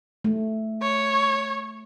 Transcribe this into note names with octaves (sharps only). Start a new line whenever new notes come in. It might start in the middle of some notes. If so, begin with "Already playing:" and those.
A3
C#5